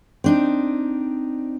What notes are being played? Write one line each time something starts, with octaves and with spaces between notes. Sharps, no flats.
C4 D4 D#4